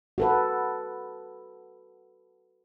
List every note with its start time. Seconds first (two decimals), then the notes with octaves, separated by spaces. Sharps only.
0.18 F#4 A4 B4